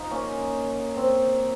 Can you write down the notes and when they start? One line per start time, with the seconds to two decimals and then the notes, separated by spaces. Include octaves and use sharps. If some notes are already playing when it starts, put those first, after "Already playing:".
Already playing: D#4 F4
0.11 A#3 C#4
0.97 C4